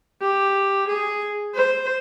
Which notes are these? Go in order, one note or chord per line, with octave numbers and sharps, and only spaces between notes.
G4
G#4
C5